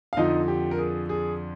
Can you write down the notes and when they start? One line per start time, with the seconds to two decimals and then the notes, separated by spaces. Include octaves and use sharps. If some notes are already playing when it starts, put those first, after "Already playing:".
0.13 F5
0.17 F2 D3 F3 D#4 D#5
0.48 G4
0.71 A#4
0.78 G#4
1.09 G#4